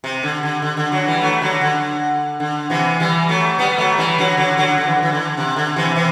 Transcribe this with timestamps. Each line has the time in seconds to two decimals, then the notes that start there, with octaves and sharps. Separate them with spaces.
0.04 C3
0.23 D3
0.43 D3
0.62 D3
0.77 D3
0.92 D3 F#3
1.07 E3 G3
1.21 F#3 A3
1.42 D3 F#3
1.61 D3
2.40 D3
2.70 C3 E3
3.00 E3 G3
3.29 F#3 A3
3.59 G3 B3
3.78 F#3 A3
3.98 E3 G3
4.18 D3 F#3
4.37 D3 F#3
4.57 D3 F#3
4.78 D3
4.87 E3
4.95 D3
5.03 E3
5.12 D3
5.37 C3
5.56 D3
5.76 C3 E3
5.95 C3 E3